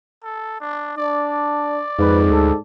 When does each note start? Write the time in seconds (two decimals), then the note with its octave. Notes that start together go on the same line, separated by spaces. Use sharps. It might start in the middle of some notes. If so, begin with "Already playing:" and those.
0.23 A4
0.61 D4
0.97 D4 D5
1.99 F2 G#2 B4
2.30 D2 A4